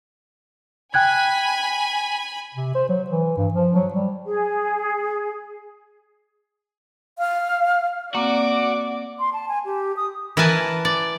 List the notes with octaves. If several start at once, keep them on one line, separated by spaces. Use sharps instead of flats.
G5 G#5 B5 F#6 G#6
C3
C5
F#3
E3
G2
F3
F#3
G3
G#4
F5
A#3 C4 F#4 D5 D6
C6
A5
G#5
G4
D#6
E3 A#4 B4 G#5 A5
D5